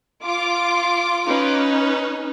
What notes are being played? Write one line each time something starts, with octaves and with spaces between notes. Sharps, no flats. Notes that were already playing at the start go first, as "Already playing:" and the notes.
F4 D6
C#4 D#4 B4